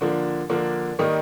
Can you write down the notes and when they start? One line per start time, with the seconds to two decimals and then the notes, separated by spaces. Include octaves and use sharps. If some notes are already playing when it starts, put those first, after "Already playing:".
0.01 D3 F3 A#3 D4
0.49 D3 F3 A#3 D4
0.99 D#3 G3 A#3 D#4